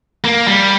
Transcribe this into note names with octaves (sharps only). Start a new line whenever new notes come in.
A#3
G3